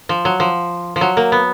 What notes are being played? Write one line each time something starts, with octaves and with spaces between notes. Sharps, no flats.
F3
F#3
F3
F3
F#3
A#3
B3